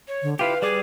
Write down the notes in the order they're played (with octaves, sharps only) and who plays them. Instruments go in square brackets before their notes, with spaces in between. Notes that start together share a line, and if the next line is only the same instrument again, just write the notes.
[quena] C#5
[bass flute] D3
[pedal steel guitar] E4 F4 G4 [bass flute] B4 [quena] F5
[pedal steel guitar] G3 D5 D6 [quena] G#4